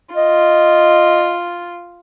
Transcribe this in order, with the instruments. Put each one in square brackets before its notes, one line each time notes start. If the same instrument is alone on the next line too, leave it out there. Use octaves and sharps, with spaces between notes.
[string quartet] F4 [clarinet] D#5